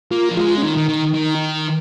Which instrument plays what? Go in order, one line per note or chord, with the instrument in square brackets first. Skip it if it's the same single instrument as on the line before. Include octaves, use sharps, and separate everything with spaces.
[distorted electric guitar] A#3 [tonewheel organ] F4
[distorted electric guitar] F3
[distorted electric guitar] G#3 [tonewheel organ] F4
[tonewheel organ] C#4
[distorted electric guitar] D#3 [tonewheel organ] D#4
[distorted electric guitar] D#3
D#3
D#3